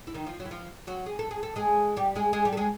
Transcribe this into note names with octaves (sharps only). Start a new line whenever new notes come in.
E4
D#3 D#4
F3 F4
F#3 F#4
E4
F3 F4
F#3 F#4
G#4
A4
G#4
A4
G#3 G#4
G3 G4
G#3 G#4
G#3 G#4
G3 G4
A4
G#3 G#4